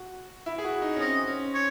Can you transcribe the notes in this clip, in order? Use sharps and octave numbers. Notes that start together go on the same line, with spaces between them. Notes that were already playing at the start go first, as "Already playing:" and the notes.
Already playing: F#4
E4
G#4
F#4
D#4
C#4
C4 D#5
C#4
C#5